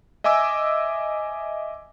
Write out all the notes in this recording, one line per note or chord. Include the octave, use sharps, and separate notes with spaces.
D#5 E5 G#5 D6 E6